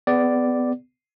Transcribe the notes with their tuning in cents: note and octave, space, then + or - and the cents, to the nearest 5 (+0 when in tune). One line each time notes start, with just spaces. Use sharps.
B3 +25 G#4 +0 D5 +0